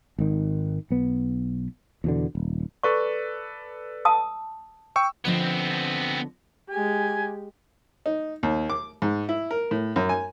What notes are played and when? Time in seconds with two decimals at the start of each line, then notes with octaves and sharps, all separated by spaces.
0.19 G#1 D#3
0.90 B1 B3
2.04 E2 B2 D3
2.35 D#1
2.83 A4 B4 D5 C#6
4.05 A5 D#6 E6
4.96 G5 C#6 E6
5.25 D3 F3 B3 C4 D#5
6.70 G#3 G4 G#5
8.06 D#4
8.43 D#2
8.70 D6
9.02 G#2
9.29 E4
9.51 A#4
9.71 A2
9.96 F#2
10.09 G#5